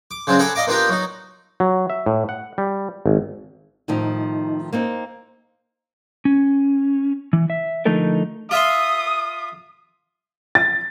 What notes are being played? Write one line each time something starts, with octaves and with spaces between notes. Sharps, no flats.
D6
C#3 F#3 C4 D4
G#4 A4 F#5 A#5 B5 D6
D5 D#5 F5 A#5 D6
A#3 B3 D4 F4 G4 A#4
F#3 D#4
F#3
E5
A2
F#5
G3
G#1
A2 D#3 F3 D#4
A#3 C4 D#4
C#4
E3
E5
D3 F3 A3 D#4 A4 A#4
F4 E5 C6 D#6
A6